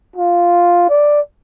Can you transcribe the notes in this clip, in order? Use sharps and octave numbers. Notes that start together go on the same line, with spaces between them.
F4
D5